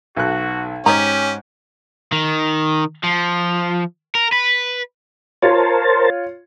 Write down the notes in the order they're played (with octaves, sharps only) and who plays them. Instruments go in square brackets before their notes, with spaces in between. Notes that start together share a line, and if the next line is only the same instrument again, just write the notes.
[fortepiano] B1 A4 F#6 [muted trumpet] F#4
[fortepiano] G#2 [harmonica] C#4 [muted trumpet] G4 [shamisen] C#5 D#5 A#5
[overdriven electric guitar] D#3
F3
A#4
B4
[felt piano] F4 C#5 [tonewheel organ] A#4 C5 A5